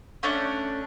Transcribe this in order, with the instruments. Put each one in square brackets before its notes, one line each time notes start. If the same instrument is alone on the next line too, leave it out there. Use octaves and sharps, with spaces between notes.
[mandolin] A3 C#4 D4 F#6